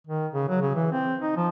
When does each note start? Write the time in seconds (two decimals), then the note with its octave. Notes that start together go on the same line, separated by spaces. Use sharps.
0.07 D#3
0.32 C#3
0.49 F#3
0.61 C#3
0.75 E3
0.92 C4
1.20 D#4
1.36 F3